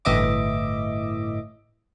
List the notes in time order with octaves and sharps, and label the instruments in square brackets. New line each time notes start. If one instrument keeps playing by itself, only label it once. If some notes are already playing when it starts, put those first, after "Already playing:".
[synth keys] G1 A2 E3 D#5 E5 D6